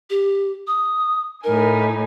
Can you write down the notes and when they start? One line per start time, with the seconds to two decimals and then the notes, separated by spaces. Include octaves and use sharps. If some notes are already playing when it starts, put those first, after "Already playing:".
0.10 G4
0.67 D#6
1.44 A2 D#4 A#4 G#5